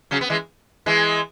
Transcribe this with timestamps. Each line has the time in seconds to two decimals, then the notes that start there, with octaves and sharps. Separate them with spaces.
0.11 C#3 F#3
0.21 B3
0.30 E3 G#3
0.86 E3 G#3